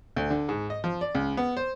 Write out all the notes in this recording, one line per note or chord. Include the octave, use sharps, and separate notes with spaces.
D2
D3
G#2
D#5
F3
D5
C#2
B3
C5